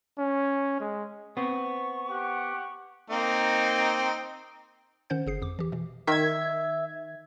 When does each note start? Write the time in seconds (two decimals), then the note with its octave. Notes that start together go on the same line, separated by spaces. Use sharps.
0.18 C#4
0.80 G#3
1.37 B3 C4 C#6
2.11 G4 F#5
3.10 A#3 C4 D#4
5.10 D#3 C#4 C5 F#5 G6
5.27 G1 G#4 C7
5.42 F2 D6
5.59 E3 G4
5.72 B2 E3
6.08 D#3 E5 G#6